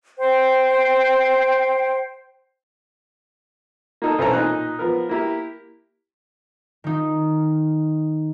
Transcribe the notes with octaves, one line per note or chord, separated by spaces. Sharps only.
C5 G5
A#3 D#4 A4
B1 E3 C4 C#4 A4 A#5
A#2 D#4 F#6
F3 B3 A#4
A#3 E4 G4
D#3 D#4